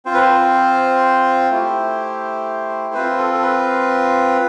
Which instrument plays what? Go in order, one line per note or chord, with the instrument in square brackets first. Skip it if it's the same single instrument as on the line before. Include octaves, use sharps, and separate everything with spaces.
[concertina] C4 F4 C5
B4
C5
A3 E4 G4
C4 F4 B4
A4
A4
B4